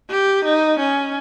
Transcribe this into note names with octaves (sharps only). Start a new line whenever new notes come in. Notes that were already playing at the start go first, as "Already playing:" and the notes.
G4
D#4
C#4